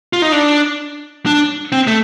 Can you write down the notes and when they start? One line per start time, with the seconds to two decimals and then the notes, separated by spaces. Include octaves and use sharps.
0.13 F4
0.22 D#4
0.32 D4
1.26 D4
1.72 C4
1.87 A3